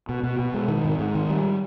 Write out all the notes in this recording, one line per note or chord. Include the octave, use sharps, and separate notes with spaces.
B2
B2
B2
G#3
D#3
G#2
G#2
D#3
G3